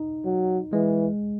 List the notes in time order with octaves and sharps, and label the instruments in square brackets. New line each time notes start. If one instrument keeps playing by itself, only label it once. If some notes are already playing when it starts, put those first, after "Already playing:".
Already playing: [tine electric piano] D#4
[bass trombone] F#3
[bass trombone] E3 [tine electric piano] G#3